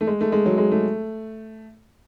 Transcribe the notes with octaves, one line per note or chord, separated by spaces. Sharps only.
A3
G#3
A3
G#3
F#3
G#3
A3